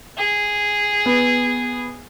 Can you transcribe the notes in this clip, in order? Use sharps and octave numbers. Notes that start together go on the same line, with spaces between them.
G#4
B3